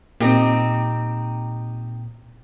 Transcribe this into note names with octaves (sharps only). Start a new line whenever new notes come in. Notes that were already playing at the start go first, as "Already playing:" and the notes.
A#2 C4 D#4 G4